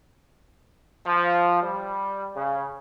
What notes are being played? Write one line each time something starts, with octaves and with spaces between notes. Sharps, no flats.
F3
G3
C#3